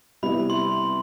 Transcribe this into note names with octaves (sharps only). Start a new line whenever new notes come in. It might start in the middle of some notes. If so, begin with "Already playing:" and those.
C3 G3 B3 E4 B5
C6